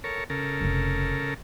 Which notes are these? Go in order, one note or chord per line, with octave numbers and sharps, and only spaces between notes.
A4 A#4 C#5
C#3 A4 A#4
F1 D4